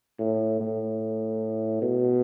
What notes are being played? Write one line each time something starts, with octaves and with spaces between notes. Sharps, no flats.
A2
A2
B2